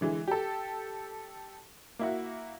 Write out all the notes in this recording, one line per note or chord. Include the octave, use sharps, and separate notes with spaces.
D3 E3 G#3
G4 A4
A#3 E4 F#4